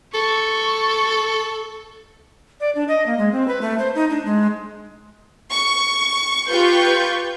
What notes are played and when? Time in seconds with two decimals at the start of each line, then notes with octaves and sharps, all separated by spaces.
0.14 A4 C#6
2.60 D5
2.75 D4
2.88 D#5
3.06 A#3
3.18 G#3
3.32 C4
3.48 B4
3.61 A3
3.79 C5
3.95 D#4
4.10 D4
4.25 G#3
5.52 C#6
6.48 F4 G4 B4 C#6 G6